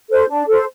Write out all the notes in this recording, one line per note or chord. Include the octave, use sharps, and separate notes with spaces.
A4 C5
D4
A4 C5